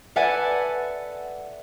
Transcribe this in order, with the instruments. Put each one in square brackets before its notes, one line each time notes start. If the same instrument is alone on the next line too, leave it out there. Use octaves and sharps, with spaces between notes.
[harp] A4 B4 D5 E5 F#5 G#5